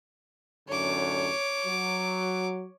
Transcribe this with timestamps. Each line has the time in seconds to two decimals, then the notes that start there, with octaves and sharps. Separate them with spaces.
0.69 A1 F#2 D3 C#5 D6
1.66 F#3